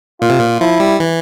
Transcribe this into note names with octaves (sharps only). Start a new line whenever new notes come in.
A#2 F4
C3
A#2
F3 E4
G3
E3